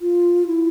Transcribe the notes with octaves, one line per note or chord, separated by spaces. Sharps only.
F4
E4